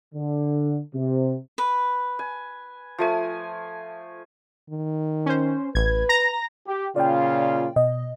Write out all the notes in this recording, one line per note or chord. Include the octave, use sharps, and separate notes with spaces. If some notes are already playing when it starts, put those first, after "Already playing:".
D3
C3
B4
G#5
F3 A3 G#5
D#3
C#4 C5
A1 B4 G#6
A#5 A#6
G4
A#2 C#3 F4 D5 G5
B2 D#5